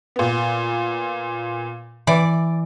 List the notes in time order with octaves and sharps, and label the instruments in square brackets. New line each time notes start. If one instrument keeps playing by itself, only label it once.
[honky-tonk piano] A#2 B3
[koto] E3 D5